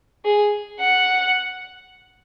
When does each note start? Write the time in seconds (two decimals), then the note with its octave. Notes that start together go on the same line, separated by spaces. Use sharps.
0.25 G#4
0.80 F#5